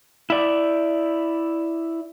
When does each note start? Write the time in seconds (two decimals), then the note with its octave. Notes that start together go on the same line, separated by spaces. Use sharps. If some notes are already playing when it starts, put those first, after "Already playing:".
0.30 E4 D5